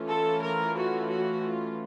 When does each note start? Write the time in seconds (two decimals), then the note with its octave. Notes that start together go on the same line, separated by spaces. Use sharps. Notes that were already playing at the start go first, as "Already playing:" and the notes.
Already playing: E3 A3 C#4 F4
0.09 A4
0.42 A#4
0.76 F#4
1.11 F#4
1.44 F4